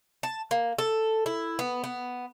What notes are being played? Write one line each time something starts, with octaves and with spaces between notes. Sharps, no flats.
A5
A#3
A4
E4
B3
B3